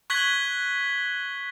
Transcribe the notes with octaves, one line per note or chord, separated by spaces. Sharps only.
C#6 F#6 G#6 B6 F#7 G7